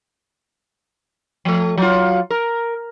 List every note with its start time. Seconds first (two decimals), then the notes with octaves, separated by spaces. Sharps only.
1.45 F3 A3
1.77 F#3 F4
2.30 A#4